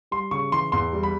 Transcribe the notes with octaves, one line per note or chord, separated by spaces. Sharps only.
G3 C6
C#3 C#6
E3 C6
E2 C6
G3
B5